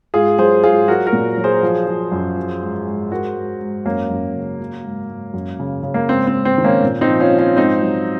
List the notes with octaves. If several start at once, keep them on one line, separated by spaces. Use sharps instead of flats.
G#2 F4 G#4
F#3 G#4 C5
G#2 F4 G#4
F#3 F#4 A#4
F#4 A#4
A#2
F#3
G#4 C5
F3
F3
F#2
F#3
G#2
G#2
G#2 F#4 A#4
G#2
G#2
F#2 A#3 C#4
F#2
C#3
F#3
G#2
G#2
F#2
C#3
C#3
A#3
G#2 C4
C4
G#2
C4
D#3
A#3 C#4
A#2
C4 D#4
F3
C#4 F4
F3
C#4 F4
G#2 C4 D#4
F#3